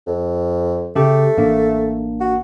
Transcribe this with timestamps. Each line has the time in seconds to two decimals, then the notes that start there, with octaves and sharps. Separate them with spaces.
0.07 F2
0.96 C#3 A3 G4
1.37 A1 A#3 D4
2.20 F#4